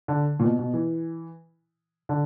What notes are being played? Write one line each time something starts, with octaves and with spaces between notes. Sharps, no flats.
D3
A#2
B2
B2
E3
D3